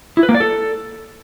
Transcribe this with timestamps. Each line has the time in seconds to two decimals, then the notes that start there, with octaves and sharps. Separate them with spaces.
0.17 E4
0.23 B4
0.29 A#3
0.35 D5
0.40 A4